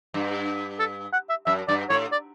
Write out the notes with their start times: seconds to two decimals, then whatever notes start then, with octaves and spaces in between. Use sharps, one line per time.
0.14 G2
0.80 A4
1.13 F#5
1.30 E5
1.46 F#2 E5
1.68 G2 D5
1.90 A2 C#5
2.12 D5